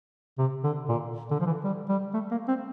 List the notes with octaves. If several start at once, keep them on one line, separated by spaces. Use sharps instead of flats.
C3
D3
A#2
D3
F3
E3
G3
G3
A3
A#3
C4